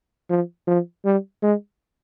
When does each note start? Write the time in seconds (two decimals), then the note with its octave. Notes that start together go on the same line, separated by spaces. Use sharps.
0.30 F3
0.67 F3
1.05 G3
1.43 G#3